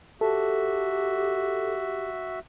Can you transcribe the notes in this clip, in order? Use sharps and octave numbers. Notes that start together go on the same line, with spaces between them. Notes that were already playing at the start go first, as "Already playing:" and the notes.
F#4 G4 A4 E5